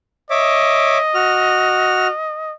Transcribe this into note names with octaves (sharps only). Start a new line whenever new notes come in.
C#5 D#5 E5 D6
F#4 F6